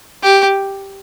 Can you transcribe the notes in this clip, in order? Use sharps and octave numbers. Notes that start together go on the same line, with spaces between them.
G4